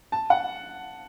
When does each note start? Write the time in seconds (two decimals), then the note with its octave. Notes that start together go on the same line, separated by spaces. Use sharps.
0.12 A5
0.30 F#5